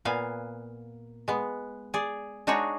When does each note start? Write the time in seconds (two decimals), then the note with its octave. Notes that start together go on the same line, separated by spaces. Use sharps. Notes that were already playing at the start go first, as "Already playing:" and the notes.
0.05 A#2 B3 F5 G#5
1.28 G#3 B3
1.94 G#4 D5
2.47 G#3 D4 D#4 F#4 G#4 C#5